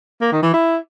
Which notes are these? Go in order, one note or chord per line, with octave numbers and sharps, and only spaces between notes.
A#3
D#3
E3
E4